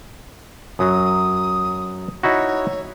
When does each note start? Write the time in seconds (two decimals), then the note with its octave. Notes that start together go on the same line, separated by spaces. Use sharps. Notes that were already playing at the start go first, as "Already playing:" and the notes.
0.79 F#2 F#3 D#6
2.23 D#4 E4 F#4 C#5